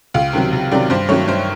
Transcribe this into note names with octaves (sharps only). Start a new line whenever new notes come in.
C#2 F5
C3 D#3 F#3
C#2
C3 D#3 F#3 D5
G2 C5
D#3 F#3 A3 C#5
G2 C5